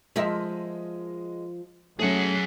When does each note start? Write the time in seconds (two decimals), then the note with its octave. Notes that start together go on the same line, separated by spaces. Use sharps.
0.16 F3 G#3 A#4 D#5 E5
1.99 F#3 A3 C#4 G#4 F#5